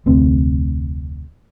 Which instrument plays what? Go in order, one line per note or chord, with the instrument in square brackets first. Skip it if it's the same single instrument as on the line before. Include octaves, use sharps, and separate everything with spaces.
[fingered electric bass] F1 D2 C4